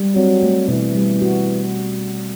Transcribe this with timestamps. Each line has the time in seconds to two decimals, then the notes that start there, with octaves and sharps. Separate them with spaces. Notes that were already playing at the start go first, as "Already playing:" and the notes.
Already playing: G3
0.15 F#3 C4
0.42 A3
0.68 B2 E3
0.95 G3
1.22 F#4